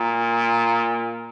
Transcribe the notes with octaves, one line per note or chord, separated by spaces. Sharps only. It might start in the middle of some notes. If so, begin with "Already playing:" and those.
Already playing: A#2